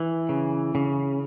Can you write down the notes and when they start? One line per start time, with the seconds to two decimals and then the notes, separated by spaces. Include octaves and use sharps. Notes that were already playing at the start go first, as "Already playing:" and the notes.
Already playing: E3
0.29 C#3
0.75 C#3